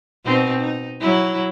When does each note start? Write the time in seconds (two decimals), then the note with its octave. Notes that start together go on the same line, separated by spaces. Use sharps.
0.25 B2 C4 D#4
0.60 D#4
1.00 F#3 E4